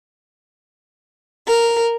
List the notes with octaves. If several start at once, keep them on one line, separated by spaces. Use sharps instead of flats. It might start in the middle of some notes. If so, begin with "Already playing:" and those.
A#4